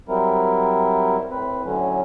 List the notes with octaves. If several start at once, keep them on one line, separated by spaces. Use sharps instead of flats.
F#3 G3 C4 E4 A#4
A2 C4 B4
A2 D3 F#3 C#4